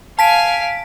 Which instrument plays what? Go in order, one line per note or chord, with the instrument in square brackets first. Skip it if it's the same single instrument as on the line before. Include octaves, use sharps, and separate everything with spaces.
[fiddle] F5 G#5 [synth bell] A5 B6 D7